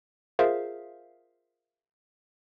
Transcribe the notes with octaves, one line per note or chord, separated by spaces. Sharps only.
F4 G#4 A#4 C5 E5 F5